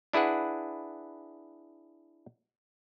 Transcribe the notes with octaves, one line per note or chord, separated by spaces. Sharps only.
D4 E4 G#4 B4 F#5